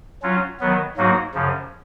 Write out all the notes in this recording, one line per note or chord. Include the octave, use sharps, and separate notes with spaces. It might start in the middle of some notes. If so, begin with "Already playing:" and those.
F#3 C#4 F4
D#3 F#3 B3
G#2 F#3 A#3 D#4 F#4
F#2 C#3 F3